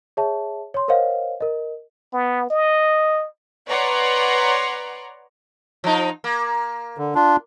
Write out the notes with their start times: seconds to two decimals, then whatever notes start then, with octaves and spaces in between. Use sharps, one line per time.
0.17 G#4 C#5 E5 A5
0.74 C#5 C6
0.88 A#4 C5 C#5 D#5 F5 F#5
1.41 A#4 D#5
2.13 B3
2.50 D#5
3.67 B4 C#5 D5 F#5 A#5 C6
5.84 F3 D#4
6.24 A#3
6.98 D3
7.15 D4 F4